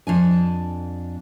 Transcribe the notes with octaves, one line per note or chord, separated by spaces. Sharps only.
F2 D4 G#5